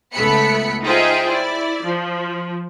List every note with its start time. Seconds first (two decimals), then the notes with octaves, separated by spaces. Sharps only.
0.13 C#2 A3 B3 B5 C#7
0.84 D#4 F4 G#4 C5 E5 G5
1.29 E4 D5
1.84 F3